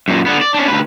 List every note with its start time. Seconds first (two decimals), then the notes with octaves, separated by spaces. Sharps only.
0.08 F#2 A#2
0.26 D3 B3
0.41 D5
0.54 C#4 D4
0.68 D2 B4